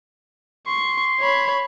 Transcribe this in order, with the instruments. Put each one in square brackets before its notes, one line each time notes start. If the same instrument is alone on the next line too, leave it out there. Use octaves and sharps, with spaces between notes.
[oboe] C6 [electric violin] C#6
[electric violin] C#5 B5